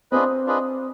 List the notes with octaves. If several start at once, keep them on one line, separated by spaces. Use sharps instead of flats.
C4 D4 F4 G#4 B4 D#5
D4 F4 G#4 B4 D#5